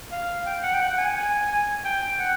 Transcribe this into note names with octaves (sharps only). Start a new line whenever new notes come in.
F5
G5
F#5
G5
F#5
G#5
G5
F#5